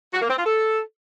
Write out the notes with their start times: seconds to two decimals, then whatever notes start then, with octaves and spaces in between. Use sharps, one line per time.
0.14 F#4
0.22 A#3
0.30 C4
0.38 F4
0.46 A4